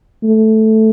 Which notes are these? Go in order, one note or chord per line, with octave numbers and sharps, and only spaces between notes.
A3